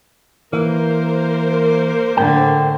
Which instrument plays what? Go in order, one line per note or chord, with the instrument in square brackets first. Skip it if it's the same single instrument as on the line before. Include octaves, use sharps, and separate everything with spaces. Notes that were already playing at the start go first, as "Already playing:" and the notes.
[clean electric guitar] E3 [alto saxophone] A#3 [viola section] A#4 C5
[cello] A2 D3 [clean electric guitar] G5